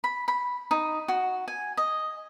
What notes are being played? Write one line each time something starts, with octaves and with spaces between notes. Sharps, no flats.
B5
B5
D#4
F#4
G#5
D#5